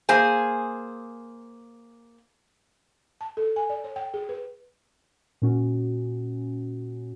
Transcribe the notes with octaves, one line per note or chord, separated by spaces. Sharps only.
A#3 G#4 C5 G#5
A5
A4
G#5
D5
C#5
G5
G#4
B4
A#2 C#4 F#4